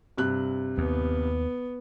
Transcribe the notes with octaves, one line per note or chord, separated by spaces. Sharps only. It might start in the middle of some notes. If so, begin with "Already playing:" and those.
G2 C3 F#6
D#2 B3